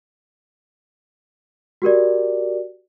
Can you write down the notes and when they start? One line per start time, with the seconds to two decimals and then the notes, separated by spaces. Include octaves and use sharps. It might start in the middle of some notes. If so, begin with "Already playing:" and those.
1.82 F#4 G4 A#4 D5